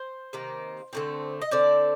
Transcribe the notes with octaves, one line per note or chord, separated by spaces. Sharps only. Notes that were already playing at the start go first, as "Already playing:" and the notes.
Already playing: C5
C3 D#3 A#3
D3 A3 C4
D#5
D3 A3 C4 D5